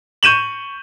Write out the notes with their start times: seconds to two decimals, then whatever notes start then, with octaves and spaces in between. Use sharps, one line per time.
0.23 C#6 G6 D#7 E7 F#7